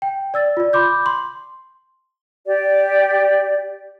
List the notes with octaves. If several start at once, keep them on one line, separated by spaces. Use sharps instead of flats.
G5
D5 E6 A6
F4 D5
B5 C6 D6 G6
C6
G4 D5